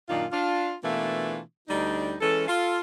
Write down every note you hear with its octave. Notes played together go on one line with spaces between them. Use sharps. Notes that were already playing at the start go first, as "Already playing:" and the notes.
F#2 A#2 D#3 D4 F4
D4 F4
B2 E3 A3 A#3 D4 F4
D2 G3 D4 D#4
E3 G#3 C#4 A4
F4 A4